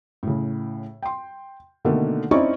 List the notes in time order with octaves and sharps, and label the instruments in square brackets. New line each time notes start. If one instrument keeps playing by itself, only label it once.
[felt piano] A2 C#3
G5 C6
B2 D3 D#3 A3 A#3
C4 C#4 D#4 E4 D5 C#6